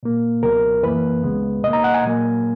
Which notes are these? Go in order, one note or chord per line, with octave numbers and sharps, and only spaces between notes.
A#2 A#3
C#2 B2 F#3 B3 A#4
F#2 E3 A#3 B4
C#2 C#3 G#3 B3
B2 A#3 D#5
A#5
F#5
G#5
A#2 F#3 A#3